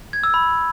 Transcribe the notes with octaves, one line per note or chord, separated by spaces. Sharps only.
G#6
E6
B5